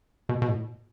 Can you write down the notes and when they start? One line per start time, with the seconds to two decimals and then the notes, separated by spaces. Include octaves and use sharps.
0.29 B2
0.42 B2
0.49 A2